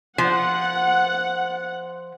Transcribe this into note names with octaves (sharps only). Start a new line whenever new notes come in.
F3 F#5